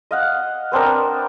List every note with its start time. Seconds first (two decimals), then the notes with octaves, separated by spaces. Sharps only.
0.11 D#5 F5 F#5
0.72 B3 C4 D4 A#4